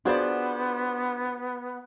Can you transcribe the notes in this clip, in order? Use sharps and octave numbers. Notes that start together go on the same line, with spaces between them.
B3 D4 F4 F#4 G#4 C5 D5